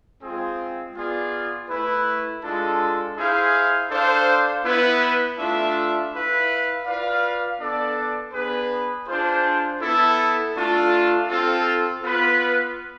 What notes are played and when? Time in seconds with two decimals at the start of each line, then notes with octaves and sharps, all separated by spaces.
0.22 G#3 C4 F4 G#4
0.95 B3 F4 G#4 D5
1.69 A3 E4 B4
2.43 G#3 D4 F4 A4
3.16 E4 G#4 C5 F5
3.89 D4 A4 C5 F5
4.64 B3 E4 B4
5.38 A3 D4 F4 A4 E5
6.12 E4 B4 F5
6.85 F4 B4 D5 F5
7.58 B3 D4 A4 D5
8.33 B3 D4 G#4 B4
9.07 D4 F4 G#4 C5
9.80 B3 E4 A4
10.54 A3 D4 F4 A4
11.27 C4 F4 A4
12.02 B3 F4 B4